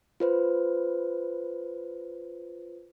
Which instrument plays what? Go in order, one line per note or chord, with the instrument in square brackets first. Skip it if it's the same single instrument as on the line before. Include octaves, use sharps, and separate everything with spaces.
[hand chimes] F4 B4 C5